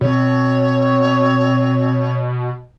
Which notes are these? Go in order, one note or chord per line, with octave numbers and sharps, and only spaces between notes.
B2 C4 C#5